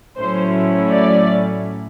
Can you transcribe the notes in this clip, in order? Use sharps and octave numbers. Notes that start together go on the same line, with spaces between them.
A2 F#3 A3 C#4 E4 C5
D5